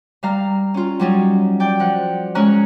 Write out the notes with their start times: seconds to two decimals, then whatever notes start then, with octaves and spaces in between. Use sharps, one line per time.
0.23 G3 F5 A#5
0.74 C#4 F4
1.00 F#3 G3 C#4 D#4
1.60 D5 G5
1.80 F3 F#5
2.35 G#3 C#4 C#5 A#5 F6 F#6